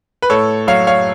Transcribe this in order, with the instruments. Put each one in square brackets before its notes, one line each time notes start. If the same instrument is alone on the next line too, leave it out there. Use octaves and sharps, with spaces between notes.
[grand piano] B4
A2 A4 C#5
F#3 C#5 F5
C#5 F5